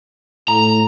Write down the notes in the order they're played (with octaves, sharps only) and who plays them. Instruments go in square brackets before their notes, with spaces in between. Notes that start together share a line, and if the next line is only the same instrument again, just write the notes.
[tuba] A2 [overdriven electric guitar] A#5